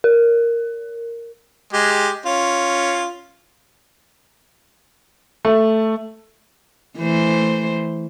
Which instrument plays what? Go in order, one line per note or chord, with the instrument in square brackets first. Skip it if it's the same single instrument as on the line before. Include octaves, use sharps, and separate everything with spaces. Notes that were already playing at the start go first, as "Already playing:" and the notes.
[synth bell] A#4
[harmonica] G#3 G4
C#4 F4
[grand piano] A3
[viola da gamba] E3 A3 C5